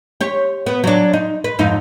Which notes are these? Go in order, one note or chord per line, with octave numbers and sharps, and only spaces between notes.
G4 C#5
B3
F#3 D4
D#4
B4
F2 G#2 D#4